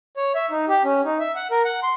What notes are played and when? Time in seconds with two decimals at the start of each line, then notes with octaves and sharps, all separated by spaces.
0.17 C#5
0.35 E5
0.51 D#4
0.68 G4
0.84 C#4
1.05 D#4
1.20 E5
1.36 F#5
1.51 A#4
1.65 F#5
1.83 C6